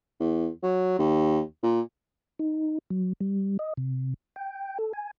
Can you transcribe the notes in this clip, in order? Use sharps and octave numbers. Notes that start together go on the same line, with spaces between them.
E2
F#3
D#2
A#2
D#4
F#3
G3
D#5
C3
G5
A4
G#5